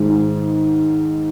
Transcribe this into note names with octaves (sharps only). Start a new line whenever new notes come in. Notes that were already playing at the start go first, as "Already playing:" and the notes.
Already playing: G#2 D#3 G#3